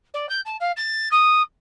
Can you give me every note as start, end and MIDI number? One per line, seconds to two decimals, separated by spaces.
0.14 0.29 74
0.29 0.40 91
0.45 0.56 81
0.60 0.71 77
0.76 1.08 93
1.11 1.42 87